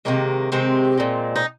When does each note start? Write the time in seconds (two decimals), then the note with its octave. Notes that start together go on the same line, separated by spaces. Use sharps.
0.05 C3 D#3 G#3 A#3
0.52 C3 D#3 G#3 C4
0.98 A#2 G#3
1.36 D#4